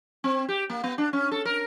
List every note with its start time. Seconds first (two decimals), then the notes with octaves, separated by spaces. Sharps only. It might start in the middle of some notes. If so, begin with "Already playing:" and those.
0.24 C4
0.49 G4
0.70 A#3
0.84 B3
0.98 D4
1.13 C#4
1.31 A4
1.45 A#4